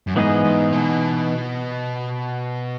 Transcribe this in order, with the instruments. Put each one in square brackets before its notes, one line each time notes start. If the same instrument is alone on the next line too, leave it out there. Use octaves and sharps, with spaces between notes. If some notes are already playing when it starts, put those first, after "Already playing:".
[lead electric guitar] F#2
[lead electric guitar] G#2 [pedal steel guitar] E3 B3 D#4 G#4 D#5
[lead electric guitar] G#2
B2